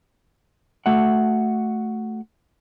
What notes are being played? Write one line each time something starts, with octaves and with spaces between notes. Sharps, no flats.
A3 F#4 E5 F#5